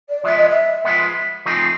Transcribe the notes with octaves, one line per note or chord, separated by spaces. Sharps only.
D5
F3 G#3 B3 E5
D#5
E5
F3 G#3 B3
F3 A3 C4 D#4 G#4